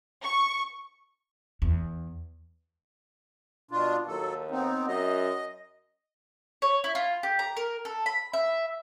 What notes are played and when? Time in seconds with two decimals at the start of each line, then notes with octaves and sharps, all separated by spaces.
0.23 C#6
1.62 E2
3.71 B2 D4 F4
4.08 D#2 F#3 A4
4.51 B3 C4 D#4
4.88 F#2 D#5
6.62 C#5
6.84 E4
6.95 F4
7.23 G4
7.39 A#5
7.57 A#4
7.85 A4
8.06 B5
8.33 E5